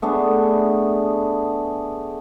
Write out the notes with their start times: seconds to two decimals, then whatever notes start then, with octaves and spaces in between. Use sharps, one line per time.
0.02 A3 B3 D4 G#4